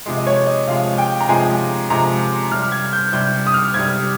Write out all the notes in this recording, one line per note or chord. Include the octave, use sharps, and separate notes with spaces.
C3 F3 G#3
D#5
C#5
D#5
C3 F3 G#3 F5
G5
A#5
C3 F3 G#3 G#5
C3 F3 G#3 A#5
C3 G3 F6
G#6
G6
C3 G3 G6
D#6
F6
C3 G3 G#6